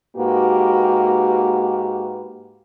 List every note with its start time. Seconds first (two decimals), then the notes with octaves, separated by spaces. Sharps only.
0.15 G#2 A#3 F#4 G4 B4